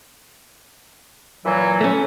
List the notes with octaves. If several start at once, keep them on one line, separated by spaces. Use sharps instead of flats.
A#2 E3 F#3
A3 C#4